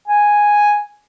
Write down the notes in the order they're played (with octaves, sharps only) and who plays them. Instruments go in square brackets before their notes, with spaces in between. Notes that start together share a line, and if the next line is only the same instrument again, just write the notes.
[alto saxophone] G#5